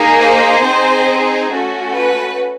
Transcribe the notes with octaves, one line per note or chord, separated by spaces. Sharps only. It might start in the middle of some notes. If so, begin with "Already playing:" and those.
Already playing: A#3 D#4 G#4
C5
C4 D#4 G#4
A3 C#4 F#4
B4